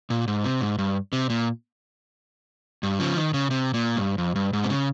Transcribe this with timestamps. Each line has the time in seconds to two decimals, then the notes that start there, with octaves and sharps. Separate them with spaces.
0.10 A#2
0.28 G#2
0.44 C3
0.61 G#2
0.78 G2
1.13 C3
1.30 A#2
2.83 G2
3.00 C#3 F3
3.16 D#3
3.34 C#3
3.51 C3
3.74 A#2
3.97 G2
4.18 F2
4.35 G2
4.53 G#2
4.64 C3
4.70 C#3